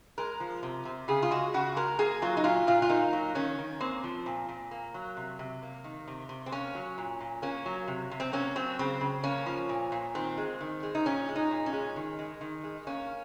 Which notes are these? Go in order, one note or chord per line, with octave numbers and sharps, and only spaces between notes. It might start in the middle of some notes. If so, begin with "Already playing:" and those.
G#3 A#4
F3
C3
C3
C#3 G#4
F4
G#3 F#4
C#3 F#4
G#3 A#4
A#3 G#4
F#3 F4
D#4
A#2 F4
A#2 F4
F4
A#3 D#4
F#3
D#3 C#4
D#3
A#3 C4
F3
A#2
A#2
A#3
F#3
C3
C3
A#3
D#3
C3
C3
C4
A#3 C#4
F#3
A#2
A#2
A#3 C#4
F#3
C3
C3
C4
A#3 C#4
F#3 C4
C#3 C4
C#3
A#3 C#4
F3
A#2
A#2
D#3 C4
G#3
D#3
G#3
D#4
A#2 C#4
G#3
D#4
A#2
C#4
G#3
D#3
G#3
D#3
G#3
A#3 C#4